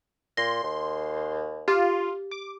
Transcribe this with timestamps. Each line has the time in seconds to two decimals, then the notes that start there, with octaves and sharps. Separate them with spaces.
0.37 A#2 C6 A#6
0.63 D#2
1.68 F4 G4
2.31 D6